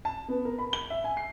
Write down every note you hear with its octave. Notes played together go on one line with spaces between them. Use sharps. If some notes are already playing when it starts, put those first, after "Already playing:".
A5
B3
A#4
B5
G7
E5
G#5
C7